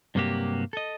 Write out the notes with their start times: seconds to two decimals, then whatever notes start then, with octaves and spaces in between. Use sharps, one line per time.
0.15 G2 C3 F#3 A#3 F#4 G4
0.73 A4 D#5